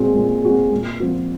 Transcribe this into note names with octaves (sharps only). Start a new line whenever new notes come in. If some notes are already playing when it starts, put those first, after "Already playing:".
Already playing: A#2 G#3 C4 F#4
A#2
G#3 C4 F#4
A#2
F3 C4 F#4